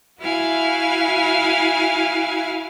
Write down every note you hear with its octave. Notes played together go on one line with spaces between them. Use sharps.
E4 F#4 F5 G#5